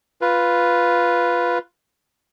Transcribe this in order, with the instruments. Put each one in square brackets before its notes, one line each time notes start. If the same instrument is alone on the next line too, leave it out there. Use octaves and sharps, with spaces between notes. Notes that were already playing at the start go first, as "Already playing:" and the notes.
[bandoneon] F4 B4